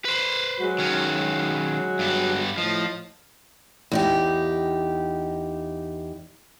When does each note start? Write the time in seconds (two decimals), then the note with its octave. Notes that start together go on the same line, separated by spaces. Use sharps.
0.05 B4 C5
0.60 F#3 G#3 F#4
0.79 D#3 C#4
1.99 G2 B3
2.58 A2 F3 D#5
3.92 E2 D#4 G4